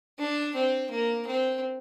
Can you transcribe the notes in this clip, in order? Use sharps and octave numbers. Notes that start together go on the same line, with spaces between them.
D4
C4
A#3
C4